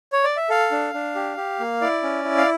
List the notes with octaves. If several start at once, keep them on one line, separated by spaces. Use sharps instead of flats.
C#5
D5
E5
A4 F5
D4
D4
G4
G4
A#3
E4 D5
C#4
E4
F5